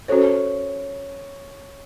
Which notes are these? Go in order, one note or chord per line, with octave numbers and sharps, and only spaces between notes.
C#4 F#4 A4 C5 C#5